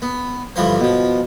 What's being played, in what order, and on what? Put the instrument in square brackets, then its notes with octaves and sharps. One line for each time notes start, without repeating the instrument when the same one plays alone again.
[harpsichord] B3
G2 D3 E3 F3 C5
B2 F3